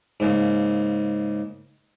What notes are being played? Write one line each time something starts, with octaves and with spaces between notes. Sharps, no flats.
G#2 C#3 A#3